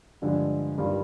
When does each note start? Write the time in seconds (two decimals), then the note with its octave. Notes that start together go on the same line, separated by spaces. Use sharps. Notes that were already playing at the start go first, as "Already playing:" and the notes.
0.22 G2 D3 F3 G#3
0.78 G2 D#3 G3 A#3 F4